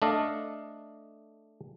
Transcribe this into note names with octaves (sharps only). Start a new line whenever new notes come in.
A3 D4 A4 D#5 F5